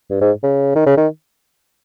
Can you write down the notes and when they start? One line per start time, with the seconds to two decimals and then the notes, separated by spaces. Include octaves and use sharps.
0.10 G2
0.21 G#2
0.43 C#3
0.75 D#3
0.86 C#3
0.97 D#3